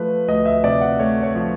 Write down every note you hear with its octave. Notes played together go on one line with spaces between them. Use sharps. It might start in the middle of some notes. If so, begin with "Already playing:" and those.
Already playing: F3 A3 B4
D2 D#5
E5
C3 D5
F#5
A3 C#5
C#5
F3